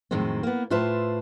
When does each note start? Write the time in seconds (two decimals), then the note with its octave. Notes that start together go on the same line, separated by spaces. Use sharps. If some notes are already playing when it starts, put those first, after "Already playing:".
0.11 F2 A2 D#3 F#3 G#3 C4
0.43 A#3 B3
0.70 A2 F4 B4 C5 E5 A5